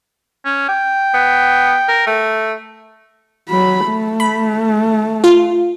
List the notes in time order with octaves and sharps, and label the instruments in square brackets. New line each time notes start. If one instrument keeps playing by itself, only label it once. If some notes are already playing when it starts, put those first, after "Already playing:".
[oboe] C#4
G5
[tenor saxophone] B3
A#4
A3
[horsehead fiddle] F#3 B5
A3
[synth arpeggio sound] B5
F4